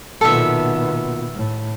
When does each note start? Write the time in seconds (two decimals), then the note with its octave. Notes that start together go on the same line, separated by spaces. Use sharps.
0.21 B1 A#2 D#3 B3 A4 E5
1.35 A2